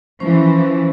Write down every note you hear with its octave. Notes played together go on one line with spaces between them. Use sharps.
E3 F3 C#4 C5